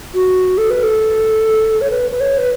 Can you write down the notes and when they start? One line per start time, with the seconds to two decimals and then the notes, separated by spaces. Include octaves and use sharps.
0.14 F#4
0.58 A4
0.70 B4
0.83 A4
1.81 C#5
1.90 B4
2.10 B4
2.20 C#5
2.38 B4